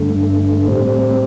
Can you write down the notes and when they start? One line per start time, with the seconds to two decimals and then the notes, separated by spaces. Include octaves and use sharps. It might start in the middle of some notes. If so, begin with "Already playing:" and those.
Already playing: G2 D3 A3
0.67 A2 G3 C4